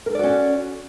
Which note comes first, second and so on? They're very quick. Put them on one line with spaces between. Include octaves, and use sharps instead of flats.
A#4 A4 D5 F#4 C#4